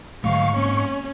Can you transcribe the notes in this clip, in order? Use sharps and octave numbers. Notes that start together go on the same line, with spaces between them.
G#2 D3 F#3 A3 F5 C#6
A#3 C4 C#4